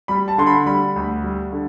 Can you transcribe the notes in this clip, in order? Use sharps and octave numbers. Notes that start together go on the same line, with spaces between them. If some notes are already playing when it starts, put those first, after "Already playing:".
G3 B5
A5
D3 C6
B5
G3 B5
D2
G3
D3